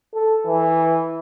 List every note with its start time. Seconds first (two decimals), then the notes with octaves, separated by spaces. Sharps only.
0.14 A4
0.46 E3